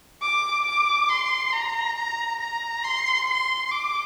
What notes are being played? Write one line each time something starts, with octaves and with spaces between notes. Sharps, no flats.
D6
D6
C6
A#5
A#5
A#5
C6
C6
D6